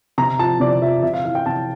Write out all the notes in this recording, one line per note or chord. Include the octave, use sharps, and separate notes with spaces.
C3 A#5
F3 A5
C3 D5
F3 E5
C3 E5
F5
E3 F5
G5
C3 A5